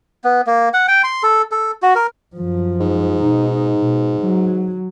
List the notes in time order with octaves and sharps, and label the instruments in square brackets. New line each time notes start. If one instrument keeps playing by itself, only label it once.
[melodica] B3
A#3
F#5
G5
C6
A4
A4
F#4
A#4
[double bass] F#2 F3
[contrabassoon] G#2
[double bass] B2 D#4
B2
F#3